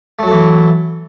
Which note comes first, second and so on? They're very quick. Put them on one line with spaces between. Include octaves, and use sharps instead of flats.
A3 F#3 A4 E3